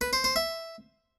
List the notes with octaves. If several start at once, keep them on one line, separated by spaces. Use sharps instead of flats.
B4
C5
C5
E5